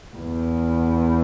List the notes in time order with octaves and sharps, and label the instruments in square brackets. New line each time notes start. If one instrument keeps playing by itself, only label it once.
[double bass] E2